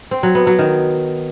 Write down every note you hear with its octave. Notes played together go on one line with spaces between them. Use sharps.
C4
F#3
B3
F#3
D#3